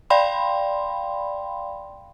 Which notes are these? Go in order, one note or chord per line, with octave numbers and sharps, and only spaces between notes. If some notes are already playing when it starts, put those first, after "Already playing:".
D5 F5 G5 B5 C6